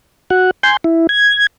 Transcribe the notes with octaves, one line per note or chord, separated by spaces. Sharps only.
F#4 F#5
G#5 C6 G6
E4
G#6